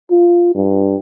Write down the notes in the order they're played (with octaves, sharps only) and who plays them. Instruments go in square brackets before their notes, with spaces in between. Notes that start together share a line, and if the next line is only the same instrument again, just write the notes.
[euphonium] F4
G2